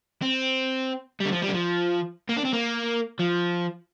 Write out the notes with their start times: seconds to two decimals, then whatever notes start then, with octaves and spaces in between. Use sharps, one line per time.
0.22 C4
1.21 G3
1.26 D3
1.32 F3
1.42 G3
1.49 D3
1.54 F3
2.29 A#3
2.37 D4
2.45 C4
2.53 A#3
3.19 F3